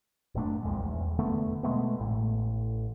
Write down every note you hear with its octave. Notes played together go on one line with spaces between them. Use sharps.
F#1 A#2 A3 D4
C2 F2 G#3
D#1 E2
F1 D3 A3 B3
B2 G#3 A3 B3
A1 A2